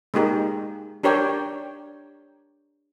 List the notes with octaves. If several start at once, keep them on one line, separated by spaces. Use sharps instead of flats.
G#3 A#3 D#4 G4 A#4
D4 G4 A#4 C#5 D5 G5